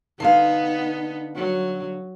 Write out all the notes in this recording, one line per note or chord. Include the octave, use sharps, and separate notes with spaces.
D3 B3 D#4 F5
F#3